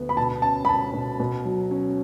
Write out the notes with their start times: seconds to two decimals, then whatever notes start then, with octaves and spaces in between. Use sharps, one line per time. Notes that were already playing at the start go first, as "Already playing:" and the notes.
Already playing: D2 B3
0.09 B5
0.17 B2 A5
0.42 C#4 A5
0.65 B5
0.69 C#4 A5
0.93 B2
1.20 B2
1.45 F#3
1.71 C#4